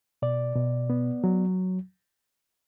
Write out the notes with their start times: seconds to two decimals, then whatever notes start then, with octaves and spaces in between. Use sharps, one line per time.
0.22 B2 D5
0.56 B2
0.90 B3
1.24 F#3